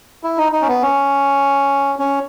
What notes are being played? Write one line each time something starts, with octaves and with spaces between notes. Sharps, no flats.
E4
D#4
D#4
C#4
B3
C#4
C#4